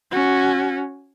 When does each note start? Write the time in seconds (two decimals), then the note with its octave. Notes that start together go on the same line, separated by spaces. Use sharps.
0.11 C#4 F#4